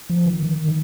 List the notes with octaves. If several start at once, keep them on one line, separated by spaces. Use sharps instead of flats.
F3
D#3
D#3
D#3